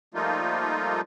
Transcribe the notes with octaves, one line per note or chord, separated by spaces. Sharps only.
F3 G3 A3 A#3 D#4 F4